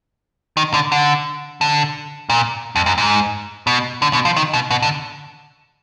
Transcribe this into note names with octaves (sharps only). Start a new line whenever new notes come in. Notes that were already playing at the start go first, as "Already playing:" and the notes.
D#3
D3
D3
D3
A#2
F2
F#2
G#2
B2
D3
B2
F3
D#3
B2
B2
D3